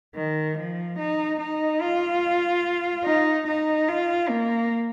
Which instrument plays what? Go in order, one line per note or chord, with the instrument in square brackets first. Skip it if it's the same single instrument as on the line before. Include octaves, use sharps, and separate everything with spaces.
[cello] D#3
F3
D#4
D#4
F4
D#4
D#4
F4
A#3